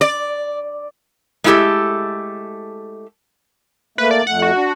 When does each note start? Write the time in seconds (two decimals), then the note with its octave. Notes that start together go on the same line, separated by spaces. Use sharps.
0.01 D5
1.44 G#3 A3 E4 F#4 G4 A4
3.98 A3 A#3 B4
4.11 D5
4.27 F2 A3 F#5
4.42 F#4
4.55 D4